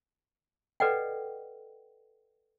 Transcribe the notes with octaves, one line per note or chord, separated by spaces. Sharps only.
A4 B4 D5 D#5 F#5 G5